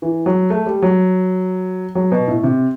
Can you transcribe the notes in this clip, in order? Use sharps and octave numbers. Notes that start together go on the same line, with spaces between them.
E3
F#3
A3
G3
F#3
F#3
B2
A2
C3